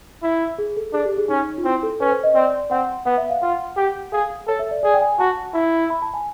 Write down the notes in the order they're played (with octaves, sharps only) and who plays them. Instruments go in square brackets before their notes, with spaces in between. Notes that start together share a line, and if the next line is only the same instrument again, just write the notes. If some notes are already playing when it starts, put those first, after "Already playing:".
[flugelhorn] E4
[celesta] G#4
A4
[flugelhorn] D4 [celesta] G#4
[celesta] G4
G#4
[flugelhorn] C#4 [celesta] D#4
[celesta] F4
[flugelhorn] C4 [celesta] E4
[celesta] A4
[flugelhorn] C#4 [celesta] B4
[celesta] C5
D#5
[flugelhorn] C4 [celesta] D5
[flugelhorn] C4 [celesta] F#5
[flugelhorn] B3 [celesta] F#5
[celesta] E5
F5
[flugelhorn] F4 [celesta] F#5
[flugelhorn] G4
[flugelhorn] G#4 [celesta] F5
[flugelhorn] A4 [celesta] C#5
[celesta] E5
D5
[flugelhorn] G#4 [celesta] D5
[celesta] G5
G#5
[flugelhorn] F#4 [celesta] A5
[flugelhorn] E4
[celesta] B5
A5
G#5